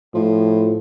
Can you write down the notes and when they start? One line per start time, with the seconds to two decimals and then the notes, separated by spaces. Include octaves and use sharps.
0.14 A2 F3